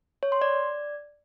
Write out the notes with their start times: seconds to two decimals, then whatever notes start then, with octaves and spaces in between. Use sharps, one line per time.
0.23 C#5
0.32 C6
0.41 D5